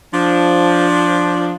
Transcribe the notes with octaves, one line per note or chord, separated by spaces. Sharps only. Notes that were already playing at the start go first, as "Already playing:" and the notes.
F3 D4